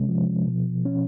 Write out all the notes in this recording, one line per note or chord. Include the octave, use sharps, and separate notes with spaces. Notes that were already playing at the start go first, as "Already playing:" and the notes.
Already playing: C3 G#3 C#4
F3
B2
C#4